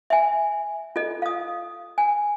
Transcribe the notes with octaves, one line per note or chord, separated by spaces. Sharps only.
E5 G#5
F4 A4 D#5
F5 D#6
G#5